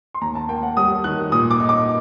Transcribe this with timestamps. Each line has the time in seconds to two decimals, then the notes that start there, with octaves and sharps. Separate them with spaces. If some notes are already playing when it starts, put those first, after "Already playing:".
0.14 C6
0.21 D#2 A#5
0.35 A5
0.49 A#3 G5
0.63 F#5
0.77 G3 D#6
1.04 D#3 F#6
1.32 A#2 D#6
1.51 D6
1.60 D#4
1.69 D6